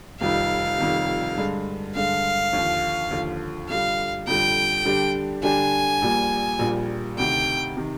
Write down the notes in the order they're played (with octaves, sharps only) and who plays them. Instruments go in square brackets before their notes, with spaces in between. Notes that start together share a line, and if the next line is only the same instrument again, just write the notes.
[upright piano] F1 F2 D#3 G3 [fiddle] F5
[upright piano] F1 F2 D#3 G3
G2 D3 G#3
[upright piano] G2 D3 G#3 [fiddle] F5
[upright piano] D#2 D3 F3
D#2 D3 F3
[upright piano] F2 D3 G3 [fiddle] F5
[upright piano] F2 D3 G3 [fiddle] G5
[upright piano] D3 G3 D4 G4
[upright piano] D3 G3 D4 G4 [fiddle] G#5
[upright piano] A#1 A#2 G3 A#3
A#1 A#2 G3 A#3
[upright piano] D2 C3 D#3 [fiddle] G5
[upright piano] C3 D#3